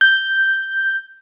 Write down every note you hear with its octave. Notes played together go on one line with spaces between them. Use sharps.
G6